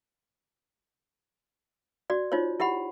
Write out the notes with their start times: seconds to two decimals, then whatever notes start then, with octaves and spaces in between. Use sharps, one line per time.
2.10 F#4 D5
2.32 D#4 F4 C5 C#5
2.60 E4 G4 F#5 B5